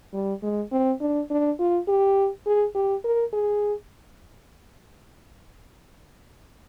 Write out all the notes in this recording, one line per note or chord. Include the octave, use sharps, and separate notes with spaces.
G3
G#3
C4
D4
D4
F4
G4
G#4
G4
A#4
G#4